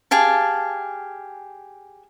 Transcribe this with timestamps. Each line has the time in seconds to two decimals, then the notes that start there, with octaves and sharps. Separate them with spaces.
0.11 G4 G#4 F5 A5